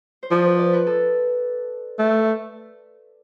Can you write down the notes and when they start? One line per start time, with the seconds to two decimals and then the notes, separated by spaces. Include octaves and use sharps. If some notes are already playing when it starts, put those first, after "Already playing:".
0.23 C5
0.31 F3 D5
0.45 B4
0.59 D5
0.73 B4
0.87 A4
1.99 A3